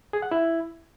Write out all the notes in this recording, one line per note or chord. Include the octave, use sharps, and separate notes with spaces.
G#4
F#5
E4